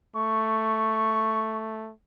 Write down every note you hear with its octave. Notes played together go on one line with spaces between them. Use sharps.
A3 C#6